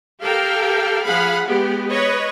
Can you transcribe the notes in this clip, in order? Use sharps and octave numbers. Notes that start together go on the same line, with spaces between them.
G4 A4 A#4 F5 G5
F3 G#4 F5 F#5 B5
G#3 B3 G4
B4 C#5 D#5